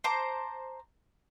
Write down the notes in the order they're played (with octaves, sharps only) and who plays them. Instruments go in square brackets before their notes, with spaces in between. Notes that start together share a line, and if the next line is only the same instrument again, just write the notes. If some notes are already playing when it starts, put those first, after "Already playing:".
[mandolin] C5 A5 A#5 D6